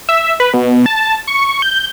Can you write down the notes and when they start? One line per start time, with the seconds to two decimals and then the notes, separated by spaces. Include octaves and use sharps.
0.09 E5
0.40 B4
0.54 B2
0.86 A5
1.27 C#6
1.62 G6